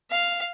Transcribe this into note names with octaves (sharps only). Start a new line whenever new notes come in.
F5